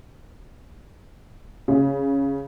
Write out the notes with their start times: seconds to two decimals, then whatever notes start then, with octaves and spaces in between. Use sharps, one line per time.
1.68 C#3